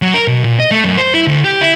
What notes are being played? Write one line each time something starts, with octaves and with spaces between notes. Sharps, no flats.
F#3
A#4
B2
A#2
D#5
A3
F#2
C5
E4
D2
G4
E4